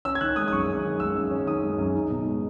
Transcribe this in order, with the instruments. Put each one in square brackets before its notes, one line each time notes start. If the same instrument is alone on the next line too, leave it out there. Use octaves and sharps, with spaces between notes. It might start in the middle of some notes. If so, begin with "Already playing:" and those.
[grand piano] C#4 E6
G#6
D#3 F#6
G#3 D#6
D#6
F#2 C#6
C#4
D#3
G#3 E6
F#2
C#4
D#3 D#6
G#3
F#2
D#4
B2
G#3